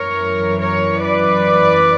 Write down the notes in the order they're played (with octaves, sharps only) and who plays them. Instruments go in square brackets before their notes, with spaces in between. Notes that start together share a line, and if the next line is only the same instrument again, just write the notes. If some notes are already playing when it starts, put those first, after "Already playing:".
Already playing: [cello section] F#2 E3 A#4 C#5
A#4 C#5
B4 D5